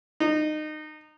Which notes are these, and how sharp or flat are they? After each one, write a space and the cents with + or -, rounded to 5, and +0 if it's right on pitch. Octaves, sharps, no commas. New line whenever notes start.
D#4 -25